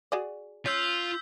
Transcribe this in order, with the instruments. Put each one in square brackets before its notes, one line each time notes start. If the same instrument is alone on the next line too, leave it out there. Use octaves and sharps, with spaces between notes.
[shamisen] F#4 G#4 D5
[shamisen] C#4 [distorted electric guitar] F4 [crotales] E6 G6 B6